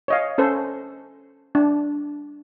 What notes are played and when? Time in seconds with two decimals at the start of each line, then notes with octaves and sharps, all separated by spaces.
0.08 C#5 D#5 F5
0.38 C#4 A4 C5
1.55 D4